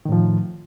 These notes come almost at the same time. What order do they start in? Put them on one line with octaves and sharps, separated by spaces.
D#3 A2 F3